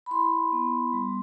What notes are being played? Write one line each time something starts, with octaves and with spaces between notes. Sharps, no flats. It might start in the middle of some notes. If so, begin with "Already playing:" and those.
B5
E4 C6
B3
G3